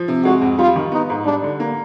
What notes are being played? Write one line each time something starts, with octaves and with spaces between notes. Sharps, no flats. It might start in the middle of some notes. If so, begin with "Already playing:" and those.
Already playing: F3
C3
G#3 F#4
F2
G3 F4
D#3
B3 D#4
G#2
G3 D4
D3
A#3